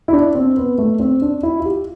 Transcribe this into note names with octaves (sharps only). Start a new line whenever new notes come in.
E4
D4
C4
B3
A3
C4
D4
E4
F4
G4